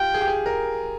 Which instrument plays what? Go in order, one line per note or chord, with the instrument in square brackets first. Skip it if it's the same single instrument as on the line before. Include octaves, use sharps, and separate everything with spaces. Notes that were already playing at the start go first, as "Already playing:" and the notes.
Already playing: [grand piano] F4 G4 [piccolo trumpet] G5
[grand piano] G#4
G4
G#4
A#4